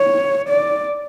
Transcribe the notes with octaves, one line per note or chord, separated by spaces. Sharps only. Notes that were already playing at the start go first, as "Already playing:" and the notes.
Already playing: C#5
D5